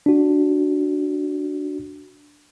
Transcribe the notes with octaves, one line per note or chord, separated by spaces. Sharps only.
D4 F#4